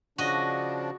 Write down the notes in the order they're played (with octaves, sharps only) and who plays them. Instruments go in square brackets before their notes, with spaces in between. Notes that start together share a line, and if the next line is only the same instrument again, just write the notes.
[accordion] C#3 F3 D4 [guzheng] F#4 D#5